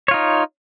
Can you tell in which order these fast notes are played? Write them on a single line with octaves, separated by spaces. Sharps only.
C#5 F4 D#4